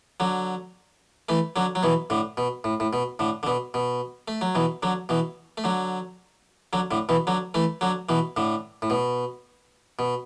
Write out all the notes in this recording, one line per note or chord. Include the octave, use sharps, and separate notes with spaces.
D3 F#3
E3 A3
D3 F#3
F#3
B2 E3
A2 D3
B2
A2
A2
B2
A2 D3
D3
B2
B2
A3
F#3
B2 E3
D3 F#3
B2 E3
A3
D3 F#3
D3 F#3
A2 D3
B2 E3
D3 F#3
E3 A3
D3 F#3
B2 E3
A2 D3
A2
B2
B2